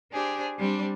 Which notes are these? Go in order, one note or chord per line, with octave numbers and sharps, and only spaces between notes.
D4 G4 G#4 C5
G3 C4 D4